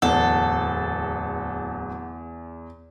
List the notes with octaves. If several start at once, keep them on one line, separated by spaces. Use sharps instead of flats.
D1 E2 A4 F#5